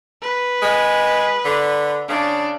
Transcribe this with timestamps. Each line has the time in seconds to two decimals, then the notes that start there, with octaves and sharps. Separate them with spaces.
0.22 B4
0.62 G#3
1.45 D3
2.09 C#3 D4